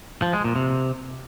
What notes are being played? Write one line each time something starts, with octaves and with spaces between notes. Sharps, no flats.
F3
G#3
A#2
C3